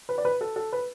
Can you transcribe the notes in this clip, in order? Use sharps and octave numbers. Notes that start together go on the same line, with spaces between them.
B4
D5
B4
A4
A4
B4